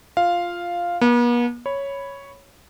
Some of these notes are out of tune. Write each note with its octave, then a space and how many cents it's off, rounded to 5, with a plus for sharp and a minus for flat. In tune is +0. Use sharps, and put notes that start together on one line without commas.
F4 +0 F5 +0
B3 -45 A5 +0
C#5 +0 B5 +0